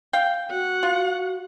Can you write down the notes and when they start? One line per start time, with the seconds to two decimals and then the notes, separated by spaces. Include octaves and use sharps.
0.13 F5 G5
0.51 F#4 F#5
0.83 F4